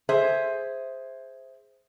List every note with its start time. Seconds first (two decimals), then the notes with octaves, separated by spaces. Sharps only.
0.09 G#4 C5 E5